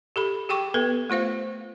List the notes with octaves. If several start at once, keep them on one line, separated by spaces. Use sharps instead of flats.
G4 A4 B5
G4 G#4 G5 C#6 D6
B3 A4 B4
A3 F4 C5 F5